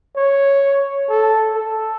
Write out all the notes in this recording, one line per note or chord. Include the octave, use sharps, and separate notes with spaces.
C#5
A4
A4